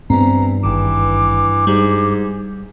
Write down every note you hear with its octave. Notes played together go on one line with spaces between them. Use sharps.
G2 E3 B3 C4 A#5
G#1 D#3 E3 D6
G#2 G3